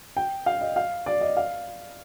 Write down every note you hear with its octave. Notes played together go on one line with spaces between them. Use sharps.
G5
F5
D#5
F5
D5
D#5
F5